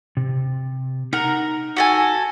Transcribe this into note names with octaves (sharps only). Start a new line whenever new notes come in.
C3
D#4 A#4 F#5
F#4 A4 G#5